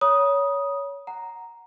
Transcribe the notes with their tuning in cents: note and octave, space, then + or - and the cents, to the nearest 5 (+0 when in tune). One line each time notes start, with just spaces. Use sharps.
C#5 +20 B5 -45 D#6 +0
F#5 +0 A#5 +0